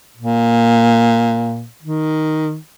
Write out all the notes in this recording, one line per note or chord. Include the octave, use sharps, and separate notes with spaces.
A#2
D#3